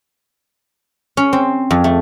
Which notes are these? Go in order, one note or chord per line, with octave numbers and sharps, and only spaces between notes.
C#4
C4
F2
A3